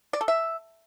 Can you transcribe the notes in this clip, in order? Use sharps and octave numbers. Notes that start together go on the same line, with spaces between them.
D5
A4
E5